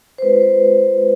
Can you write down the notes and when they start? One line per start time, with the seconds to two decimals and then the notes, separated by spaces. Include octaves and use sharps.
0.18 C5
0.22 G#3 C4 F4 B4